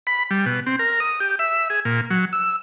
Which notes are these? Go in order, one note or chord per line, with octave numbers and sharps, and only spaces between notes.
B5
G3
B2
C4
A#4
D#6
G4
E5
G#4
A#2
F#3
E6